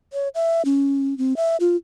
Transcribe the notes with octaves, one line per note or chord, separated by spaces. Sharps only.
C#5
E5
C#4
C4
E5
F4